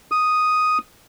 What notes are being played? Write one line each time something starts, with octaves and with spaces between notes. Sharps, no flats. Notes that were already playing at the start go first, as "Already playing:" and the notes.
D#6